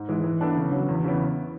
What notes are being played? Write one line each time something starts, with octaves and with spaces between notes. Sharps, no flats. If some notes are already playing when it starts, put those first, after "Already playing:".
Already playing: G#2
E3 G#3
E3
B3 D4 A4
C#3
F#3 B3
E2
C#3 E3 B3